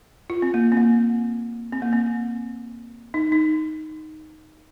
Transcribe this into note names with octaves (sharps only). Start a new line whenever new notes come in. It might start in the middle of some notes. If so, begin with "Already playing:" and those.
F4
C4
A#3
C4
A#3
C4
A#3
C4
D#4
D#4